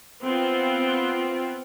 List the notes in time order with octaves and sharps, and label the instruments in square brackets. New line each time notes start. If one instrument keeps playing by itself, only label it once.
[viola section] B3 C4 F4